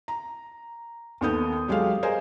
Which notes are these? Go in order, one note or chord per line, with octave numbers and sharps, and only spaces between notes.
A#5
D#2 D#3 B3 A4 D#6 G6
F#3 G#3 G4 A4 F5
G#4 A#4 C5 D#5 F5 G#5